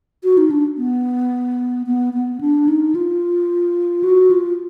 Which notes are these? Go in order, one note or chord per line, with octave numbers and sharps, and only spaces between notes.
F#4
D#4
D4
B3
B3
B3
D4
D#4
F4
F#4
F4